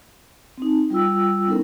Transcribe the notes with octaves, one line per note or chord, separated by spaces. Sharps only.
C4 D#4
G3 F4 G5 E6
B3 C#4 D#4 E4 A4 A#4